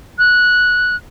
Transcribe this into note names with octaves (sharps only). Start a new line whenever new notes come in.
F#6